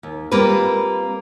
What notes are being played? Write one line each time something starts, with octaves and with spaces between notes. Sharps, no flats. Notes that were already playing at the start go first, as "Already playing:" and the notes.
D#2
G3 A#3 C4 F4 B4